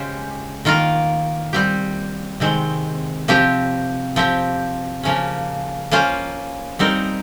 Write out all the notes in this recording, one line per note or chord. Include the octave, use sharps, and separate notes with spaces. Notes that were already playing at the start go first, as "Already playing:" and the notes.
Already playing: C#3 G#3 C#4 G4 C5
D#3 A#3 F4 A#4
G3 C4 G4
C3 D#3 G#3 C4
C3 F3 C4 G4
F3 C4 G4
C#3 F3 A#3 C#4
A#3 C#4 F4 C5
G3 C4 D#4 A#4